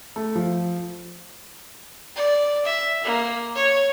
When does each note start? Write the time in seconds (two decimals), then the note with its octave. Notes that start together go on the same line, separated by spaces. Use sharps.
0.16 A3
0.35 F3
2.16 D5
2.65 E5
3.04 A#3
3.55 C#5